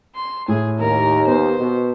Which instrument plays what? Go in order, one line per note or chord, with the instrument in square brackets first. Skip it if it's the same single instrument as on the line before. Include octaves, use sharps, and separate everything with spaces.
[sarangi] C6
[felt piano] A2 [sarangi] G#4
[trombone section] D#2 [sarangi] A#4
[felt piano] B3 [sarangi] C5
[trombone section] B2